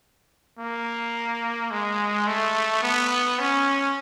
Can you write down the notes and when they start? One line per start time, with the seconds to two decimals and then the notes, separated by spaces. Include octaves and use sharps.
0.59 A#3
1.71 G#3
2.27 A3
2.83 B3
3.39 C#4